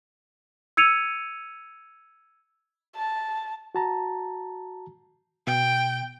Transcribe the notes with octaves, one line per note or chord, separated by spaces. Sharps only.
E6 G#6 C#7 D#7 F7
A5
F#4 A5 A#5
B2 G5